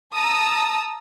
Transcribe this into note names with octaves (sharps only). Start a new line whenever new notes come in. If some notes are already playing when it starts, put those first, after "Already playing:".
A5 A#5 D#6 E6